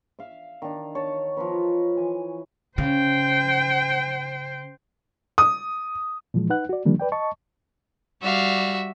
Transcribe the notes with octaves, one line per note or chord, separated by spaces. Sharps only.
E5 F5
D#3 D4
C#5 A5
F3 D#4 B4
E3 G#5
C#3 C5 G5
D#6
A#2 E3 F3 G#3
D#4 B4 F#5 F#6
F#4 D5
D3 D#3 F3 G3 A#3 D4
B4 D5 G5
D#5 A5 C#6
G3 F#4 D5 E5 F5